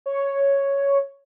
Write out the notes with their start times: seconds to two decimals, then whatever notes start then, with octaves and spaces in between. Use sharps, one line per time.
0.06 C#5